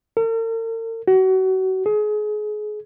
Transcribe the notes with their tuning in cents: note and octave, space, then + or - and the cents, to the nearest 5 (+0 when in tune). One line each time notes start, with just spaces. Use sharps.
A#4 -45
F#4 +30
G#4 +30